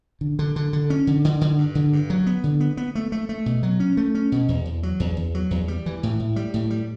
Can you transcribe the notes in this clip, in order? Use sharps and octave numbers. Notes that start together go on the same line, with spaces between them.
D3
D3
D3
D3
C#4
D3
D3
D3
G2
D3
G2
F#3
B3
D3
B3
B3
A3
A3
A3
B2
F#3
C#4
A3
C#4
B2
E2
E2
F#3
E2
E2
F#3
E2
G3
E3
A2
A2
G3
A2
G3